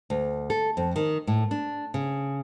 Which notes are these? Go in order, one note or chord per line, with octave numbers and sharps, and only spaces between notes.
D2
A4
F2
D#3
A2
D4
C#3